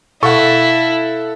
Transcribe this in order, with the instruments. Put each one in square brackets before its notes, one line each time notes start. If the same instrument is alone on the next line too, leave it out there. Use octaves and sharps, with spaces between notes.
[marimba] B2 C#6 [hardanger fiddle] E4 [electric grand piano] A4 F5 F#5